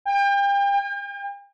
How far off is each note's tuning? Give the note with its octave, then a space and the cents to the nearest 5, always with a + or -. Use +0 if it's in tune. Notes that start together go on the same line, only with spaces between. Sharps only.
G5 +35
G5 +45